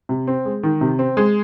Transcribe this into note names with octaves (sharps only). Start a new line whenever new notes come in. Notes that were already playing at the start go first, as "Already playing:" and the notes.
C3
C4
G#3
D#3
C3
C4
G#3